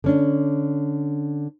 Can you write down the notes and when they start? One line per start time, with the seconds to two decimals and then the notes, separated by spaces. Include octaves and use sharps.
0.04 D3 C#4 D4